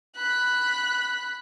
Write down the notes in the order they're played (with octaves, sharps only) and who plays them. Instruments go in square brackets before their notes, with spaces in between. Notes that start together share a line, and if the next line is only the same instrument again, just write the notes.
[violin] B5 F#6